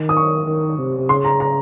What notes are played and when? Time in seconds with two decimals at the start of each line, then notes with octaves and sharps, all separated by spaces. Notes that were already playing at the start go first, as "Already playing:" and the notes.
Already playing: D#3
0.09 D#6
0.17 C#6
0.47 D#3
0.78 C3
0.99 C3
1.09 C#3 C6
1.25 A#5
1.40 A#5